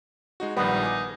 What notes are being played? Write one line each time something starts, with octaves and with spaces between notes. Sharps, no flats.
G#3 D#4 F#4
A#1 D#3 G3 B3 D#4
G#5 D6